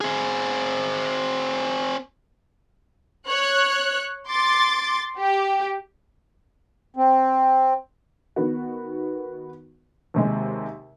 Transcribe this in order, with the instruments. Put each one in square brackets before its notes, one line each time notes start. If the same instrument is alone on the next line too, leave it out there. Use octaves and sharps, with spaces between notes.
[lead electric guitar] C4 G#4
[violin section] C#5 F#6
C6 D6 A6
G4
[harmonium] C4
[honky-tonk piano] D#3 B3 F#4
D#2 C3 G#3